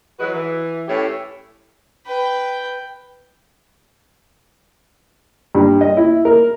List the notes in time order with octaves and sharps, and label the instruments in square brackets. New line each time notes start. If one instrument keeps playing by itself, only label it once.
[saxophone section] E3 F#3 G#3 F#4 B4
E3
A2 C#4 E4 G4 C#5
[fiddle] B4 G5
[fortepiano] G2
D#5
E4
A#4